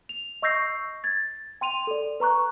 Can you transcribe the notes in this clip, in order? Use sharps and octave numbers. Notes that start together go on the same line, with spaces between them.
F7
D#5 C#6 E6 G6 A#6 C7
G#6 A6
G5 C6 D#7 F7
A4 D5
B4 A#5 C#6 F#6